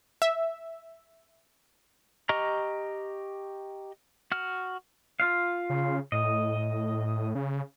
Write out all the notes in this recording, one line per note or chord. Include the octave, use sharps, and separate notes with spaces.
E5
G4 D#5 A#5 C#6 F6
F#4 F6
F4 F5
C#3
A2 D#5
C#3